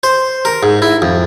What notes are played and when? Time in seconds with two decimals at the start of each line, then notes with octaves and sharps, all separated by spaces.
0.03 C5
0.45 A#4
0.63 G#2
0.82 E4
1.02 F2